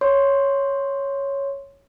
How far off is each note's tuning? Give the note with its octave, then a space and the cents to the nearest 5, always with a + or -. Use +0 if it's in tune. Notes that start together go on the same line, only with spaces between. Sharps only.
C#5 +0 C6 +0